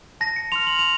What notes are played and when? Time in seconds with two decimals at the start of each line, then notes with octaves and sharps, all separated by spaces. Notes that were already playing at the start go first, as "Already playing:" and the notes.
0.21 A5 A#6
0.36 C#7
0.52 C6 F6 F7
0.67 F#7
0.79 F7